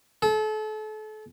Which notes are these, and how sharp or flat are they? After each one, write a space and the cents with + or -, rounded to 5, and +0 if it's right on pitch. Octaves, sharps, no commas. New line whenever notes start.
A4 -35